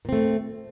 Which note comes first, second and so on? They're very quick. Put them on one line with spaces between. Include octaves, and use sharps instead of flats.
A#2 C4 A3